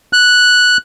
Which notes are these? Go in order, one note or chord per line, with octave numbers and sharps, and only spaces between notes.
F#6